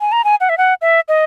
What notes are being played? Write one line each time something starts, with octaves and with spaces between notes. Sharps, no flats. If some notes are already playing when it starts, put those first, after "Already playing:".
G#5
A#5
G#5
F#5
E5
F#5
E5
D#5